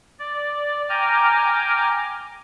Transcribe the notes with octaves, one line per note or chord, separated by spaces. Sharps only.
D5
G5 G#5 A#5 D6 F6